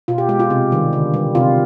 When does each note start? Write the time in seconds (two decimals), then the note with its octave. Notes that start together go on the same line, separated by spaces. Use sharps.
0.08 B2 F4
0.18 G4
0.29 G#3 G4
0.40 F4
0.50 C3
0.72 D#3 G3
0.93 D3
1.14 G3
1.35 C3 F4